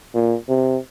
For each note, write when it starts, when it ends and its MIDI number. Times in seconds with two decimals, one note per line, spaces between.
0.15 0.35 46
0.49 0.77 48